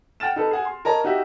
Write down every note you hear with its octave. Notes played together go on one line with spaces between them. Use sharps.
F#5 G5 F6 A6 E7
D#4 A4 B4
G#4 F#5 G#5
C6
A#4 C#5 D#5 A5 A#5
D#4 F#4 G4 E5